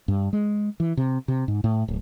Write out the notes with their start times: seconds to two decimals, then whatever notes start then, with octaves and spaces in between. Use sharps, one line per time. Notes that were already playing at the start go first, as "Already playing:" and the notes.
0.08 G2
0.33 G#3
0.80 E3
0.97 C3
1.28 C3
1.48 G#2
1.64 A2
1.88 D1